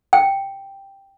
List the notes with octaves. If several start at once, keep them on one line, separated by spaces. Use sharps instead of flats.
G5